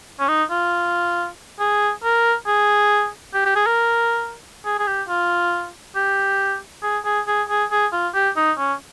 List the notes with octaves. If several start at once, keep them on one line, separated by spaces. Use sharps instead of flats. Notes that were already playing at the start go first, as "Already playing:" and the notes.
C#4
D#4
F4
G#4
A#4
G#4
G4
G4
G#4
A#4
G#4
G#4
G4
F4
G4
G#4
G#4
G#4
G#4
G#4
F4
G4
D#4
C#4